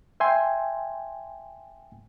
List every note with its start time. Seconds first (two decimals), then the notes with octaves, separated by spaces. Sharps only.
0.20 E5 G5 G#5 C6